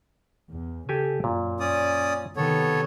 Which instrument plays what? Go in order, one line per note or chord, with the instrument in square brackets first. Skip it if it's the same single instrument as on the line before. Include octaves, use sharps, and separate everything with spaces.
[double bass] E2
[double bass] C#3 [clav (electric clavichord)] G4 A4 G#5
[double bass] F#2 [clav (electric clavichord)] A#2
[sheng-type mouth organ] C#4 D5 D#6
[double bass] C3 D#3 [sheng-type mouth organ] B3 A4 C#5